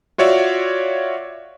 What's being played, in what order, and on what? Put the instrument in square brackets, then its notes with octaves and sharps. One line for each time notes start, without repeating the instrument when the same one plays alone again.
[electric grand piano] F4 F#4 C#5 D5 E5